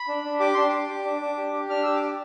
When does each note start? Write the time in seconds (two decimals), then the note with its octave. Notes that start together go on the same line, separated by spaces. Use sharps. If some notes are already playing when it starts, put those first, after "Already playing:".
Already playing: B5
0.08 D4
0.25 D4
0.40 G4 D6
0.54 D4 C6
0.68 G4 D6
0.89 G4
1.05 D4
1.21 D4
1.37 G4
1.53 G4
1.70 D4 F6
1.83 G4 E6
1.96 D6
2.02 G4